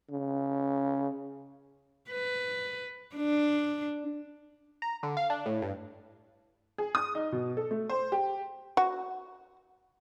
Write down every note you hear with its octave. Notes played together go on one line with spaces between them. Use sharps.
C#3
B4
D4
A#5
D3
F5
D4
A2
G2
G#4
D#6
D#4
B2
A4
A3
C5
G4
F#4